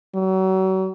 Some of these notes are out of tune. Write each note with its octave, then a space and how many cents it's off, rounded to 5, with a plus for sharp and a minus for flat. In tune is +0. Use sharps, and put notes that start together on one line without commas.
F#3 +35